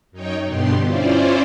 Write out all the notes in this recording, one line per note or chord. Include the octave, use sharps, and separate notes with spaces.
F#2 D#4 C#5 G5
G2 B2 D3 B3 G4 C6
C#4 E4 F4 C5 D5